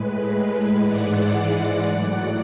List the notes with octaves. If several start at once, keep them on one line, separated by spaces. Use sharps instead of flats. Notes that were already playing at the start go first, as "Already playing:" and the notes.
Already playing: A2 G#3 B4
B4
G#2 E3 G#3 D5 F#5
A2 F#3 D5 F#5